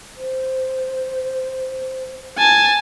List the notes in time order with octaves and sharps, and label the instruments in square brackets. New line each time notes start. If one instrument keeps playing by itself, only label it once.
[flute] C5
[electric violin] G#5 A5